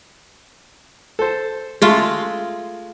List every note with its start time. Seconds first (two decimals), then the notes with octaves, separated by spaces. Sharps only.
1.19 A4 C5
1.82 G#3 A3 F4